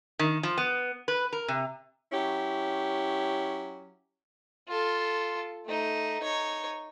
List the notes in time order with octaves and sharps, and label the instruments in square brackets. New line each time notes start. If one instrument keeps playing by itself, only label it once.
[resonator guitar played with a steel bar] D#3
F3
B3
B4
A#4
C3
[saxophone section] F#3 C#4 E4 G4
[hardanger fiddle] F4 A4
A3 D#4
D#4 C#5